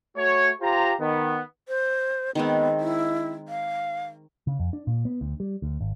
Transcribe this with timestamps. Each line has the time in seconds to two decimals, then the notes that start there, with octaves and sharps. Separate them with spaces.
0.15 A3 F#4 C#5
0.61 F4 G4 C5 A#5
1.00 D#3 B3
1.68 C5
2.35 D#3 G#3 B3 C4
2.80 E4
3.48 F5
4.47 C#3
4.59 F2
4.73 D4
4.87 A#2
5.05 B3
5.21 D2
5.40 G3
5.62 D2
5.81 G#1